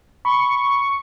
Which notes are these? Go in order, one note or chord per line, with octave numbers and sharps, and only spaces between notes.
B5 C#6